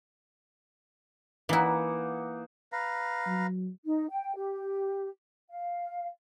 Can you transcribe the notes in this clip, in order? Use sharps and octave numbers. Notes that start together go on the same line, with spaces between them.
E3 A#3 D#4 E4 F#5
B4 F5 A#5
F#3
D#4
G5
G4
F5